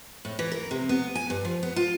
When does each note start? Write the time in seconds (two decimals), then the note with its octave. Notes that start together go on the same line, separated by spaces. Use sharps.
0.25 A2
0.39 E3
0.52 A#4
0.71 C3
0.89 B3
1.15 G#5
1.30 G2
1.45 F3
1.63 B3
1.76 F4